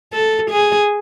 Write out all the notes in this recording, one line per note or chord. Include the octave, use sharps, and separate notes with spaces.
A4
G#4